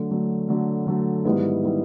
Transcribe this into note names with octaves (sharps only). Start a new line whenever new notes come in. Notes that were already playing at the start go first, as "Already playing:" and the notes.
Already playing: D3 F#3 A3
D3 F#3 A3
D3 F#3 A3
D3 F#3 A3
G#2 D#3 G3 B3 E4
D#3 G3 B3 E4